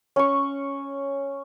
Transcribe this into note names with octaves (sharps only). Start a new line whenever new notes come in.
C#4 C#6